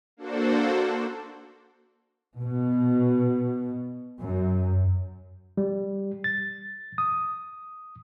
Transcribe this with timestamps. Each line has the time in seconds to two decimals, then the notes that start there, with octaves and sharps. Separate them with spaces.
0.17 A#3 D4 F#4 A4 C5
2.40 B2
4.22 F#2
5.57 G3
6.24 A6
6.98 D#6